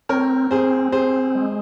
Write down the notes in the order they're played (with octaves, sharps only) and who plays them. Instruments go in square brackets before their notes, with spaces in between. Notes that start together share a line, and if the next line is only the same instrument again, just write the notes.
[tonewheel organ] C4 [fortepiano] A#4 C#5
[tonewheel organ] C4 [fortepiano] G#4 C5
[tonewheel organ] C4 [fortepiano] G#4 C5
[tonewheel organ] G#3